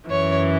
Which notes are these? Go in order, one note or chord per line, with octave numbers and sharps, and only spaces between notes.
F#2 E3 C#5